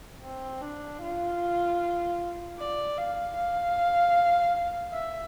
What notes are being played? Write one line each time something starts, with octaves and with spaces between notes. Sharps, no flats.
C4
D4
F4
D5
F5
F5
E5